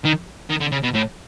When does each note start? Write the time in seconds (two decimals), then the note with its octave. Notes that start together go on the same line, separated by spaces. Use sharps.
0.05 D#3
0.50 D#3
0.61 D3
0.72 C#3
0.83 B2
0.95 A2